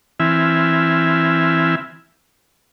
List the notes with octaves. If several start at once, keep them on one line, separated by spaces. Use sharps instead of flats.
E3 C4 E4 E5 G#5 F6